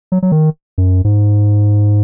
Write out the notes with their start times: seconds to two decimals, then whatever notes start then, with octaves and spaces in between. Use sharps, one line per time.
0.12 F#3
0.23 F#3
0.32 D#3
0.78 F#2
1.04 G#2